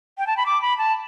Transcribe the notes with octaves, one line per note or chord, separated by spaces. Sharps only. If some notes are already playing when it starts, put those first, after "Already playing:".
G5
A5
B5
D6
B5
A5